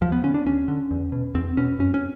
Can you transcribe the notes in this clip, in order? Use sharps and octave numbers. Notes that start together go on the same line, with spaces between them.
D#2 F3
B3
D3 C#4
D4
D#2 C#4
D3
E2
B2
E2 C4
B2 C#4
F#2 C#4
C#4